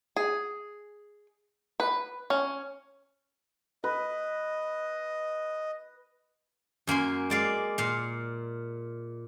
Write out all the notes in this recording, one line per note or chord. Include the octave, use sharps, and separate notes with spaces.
G#4
B4
C#4
B4 D#5
F#2 A#3 G#5 C6
G#3 D5 F5
A#2 F5